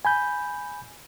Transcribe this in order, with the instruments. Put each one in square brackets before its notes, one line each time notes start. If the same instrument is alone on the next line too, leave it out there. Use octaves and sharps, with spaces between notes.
[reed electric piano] G#5 B5 G6